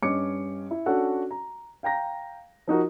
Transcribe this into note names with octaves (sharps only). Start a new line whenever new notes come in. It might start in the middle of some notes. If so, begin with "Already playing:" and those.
G2 C#4 D#5 D6 C#7
E4
C#4 D4 F#4 A4 F#5
A#5
F5 G5 A#5 A#6
F3 D#4 F#4 A#4